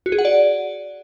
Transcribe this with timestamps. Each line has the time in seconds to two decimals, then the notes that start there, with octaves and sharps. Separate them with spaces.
0.06 F#4
0.12 G#4
0.19 F#5
0.25 D5